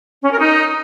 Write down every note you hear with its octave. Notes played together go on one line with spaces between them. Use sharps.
C#4
A#4
D#4